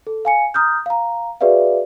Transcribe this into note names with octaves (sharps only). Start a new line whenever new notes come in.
A4
F5 G#5 C#7
A#5 D#6 F6 G6
F5 A#5
F#4 G#4 B4 D5 E5 F5